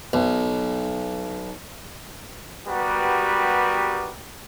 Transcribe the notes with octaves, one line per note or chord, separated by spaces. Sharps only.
B1
G3 B3 F#4 G4 A#4 B4